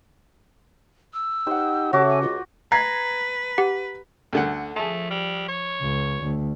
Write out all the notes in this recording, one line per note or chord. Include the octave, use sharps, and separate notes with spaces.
E6
D#4 G4 C5 F#5
C#3 F#4 G4 A4 C#5 E5 D6
G#5
C#2 F4
B4 A#5 G#6 C7
G4 F#5
D2 D3 F#5
F3 A3 G#4 A5
G3
C#5
C#2
D2